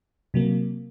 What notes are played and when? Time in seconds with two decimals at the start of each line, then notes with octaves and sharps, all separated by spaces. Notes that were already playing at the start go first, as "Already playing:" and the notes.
0.34 C3 F#3 A#3